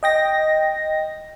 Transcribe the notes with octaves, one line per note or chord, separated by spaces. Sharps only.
D#5 G5 A#6